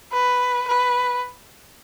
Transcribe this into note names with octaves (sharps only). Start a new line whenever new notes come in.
B4
B4